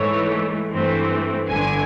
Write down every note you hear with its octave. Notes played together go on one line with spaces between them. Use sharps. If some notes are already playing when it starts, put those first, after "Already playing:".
Already playing: G#2 E3 A3 C#5
G2 E3 A3 C4
G1 G2 D3 G#5